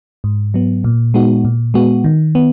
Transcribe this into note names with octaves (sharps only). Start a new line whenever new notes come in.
G#2
F#3 B3
A#2
G#3 B3 D#4 F#4
A#2
G#3 B3 F#4
D#3
B3